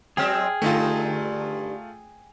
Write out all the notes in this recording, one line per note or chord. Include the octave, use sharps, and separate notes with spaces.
F#3 G#3 C4 G#4 G5 F6
G2 D3 A3 D#4 F4